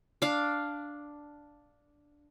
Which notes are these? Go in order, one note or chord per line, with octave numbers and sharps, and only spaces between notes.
D4 F5